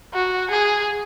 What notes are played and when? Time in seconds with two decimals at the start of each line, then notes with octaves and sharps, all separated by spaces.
0.14 F#4
0.51 G#4